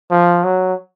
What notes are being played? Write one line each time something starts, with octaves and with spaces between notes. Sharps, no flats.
F3
F#3